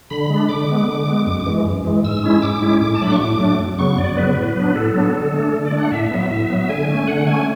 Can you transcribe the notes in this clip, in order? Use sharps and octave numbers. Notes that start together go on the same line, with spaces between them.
D3 B5
G#3 D4
D3 D6
G#3 B3
D3
G#3 B3
F#2 D6
D6
E3 G#3
F#2
E3 G#3
G#2 E6
G#3 C#4 E4
G#2 D6
G#3 C#4 E4
A2 D6
A5
F#3 A3 D4 B5
C#6
A2 D6
F#3 A3 D4
F#2
C#3 F#3 B3 C#6
F#2 D5
C#3 F#3 B3 B4
A2
F#3 B3 D4
A2 A4
F#3 B3 D4
D3
A3 D4
D3
D5
A3 D4
F#5
A2 E5
F#3 B3
A2 E5
F#3 B3
D3 G#5
A3 C#4
D3 F#5
A3 C#4 G#5